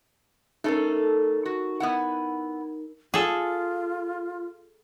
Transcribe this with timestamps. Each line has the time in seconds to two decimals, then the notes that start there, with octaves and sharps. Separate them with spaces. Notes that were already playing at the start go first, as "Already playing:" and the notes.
0.64 A3 C#4 D#4 A4 A#4
1.46 F#4
1.80 B3 E4 F#5
3.14 F4 G#4 A4